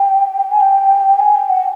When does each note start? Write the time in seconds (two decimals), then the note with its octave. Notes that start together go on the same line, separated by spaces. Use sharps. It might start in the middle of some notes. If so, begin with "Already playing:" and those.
Already playing: G5
0.51 G#5
0.60 G5
1.20 G#5
1.36 G5
1.49 F#5